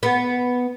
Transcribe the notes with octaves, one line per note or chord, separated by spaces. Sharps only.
B3